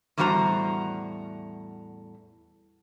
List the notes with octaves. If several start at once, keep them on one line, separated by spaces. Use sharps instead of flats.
E2 A2 G3 F#4 C5 A#5